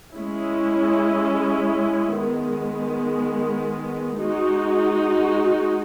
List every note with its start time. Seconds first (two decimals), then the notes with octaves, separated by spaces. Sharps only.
0.15 G#3 C#4 E4
2.18 D#3 G#3 B3
4.19 G#3 D#4 F#4